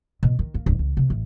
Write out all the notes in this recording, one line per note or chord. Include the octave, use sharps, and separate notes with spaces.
B2
D#3
A#3
D1
C#2
C3
A1